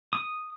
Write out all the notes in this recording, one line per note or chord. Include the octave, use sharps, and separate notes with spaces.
D#6